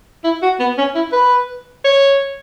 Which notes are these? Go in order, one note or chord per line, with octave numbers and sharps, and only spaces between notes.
E4
F#4
B3
C#4
E4
B4
C#5